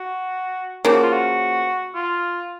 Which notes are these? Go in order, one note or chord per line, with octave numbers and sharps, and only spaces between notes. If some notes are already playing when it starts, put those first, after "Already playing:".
Already playing: F#4
C#3 F3 A#3 G4
F#4
F4
F#4
F4